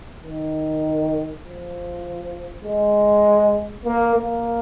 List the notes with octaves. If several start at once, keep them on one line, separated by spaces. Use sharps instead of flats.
D#3
F3
G#3
A#3
A#3